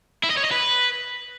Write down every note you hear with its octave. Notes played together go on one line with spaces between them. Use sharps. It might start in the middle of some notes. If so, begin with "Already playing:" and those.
E4
D#5
C#5
D#5
B4